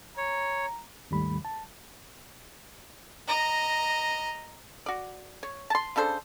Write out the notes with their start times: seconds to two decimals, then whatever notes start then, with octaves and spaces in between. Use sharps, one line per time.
0.17 C#5 A#5
1.11 D#2 G#2 D#3 G3 A3 B5
1.45 A5
3.28 D#5 A#5
4.86 F#4 D5
5.43 C#5
5.70 A5 C6
5.96 C#3 D4 A4 C5